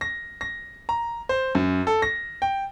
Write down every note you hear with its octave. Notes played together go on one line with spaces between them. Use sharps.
A#6
A#6
A#5
C5
F#2
A4
A#6
G5